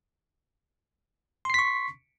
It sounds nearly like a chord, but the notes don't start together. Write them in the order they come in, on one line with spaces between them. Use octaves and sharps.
C6 C7 B6 C#6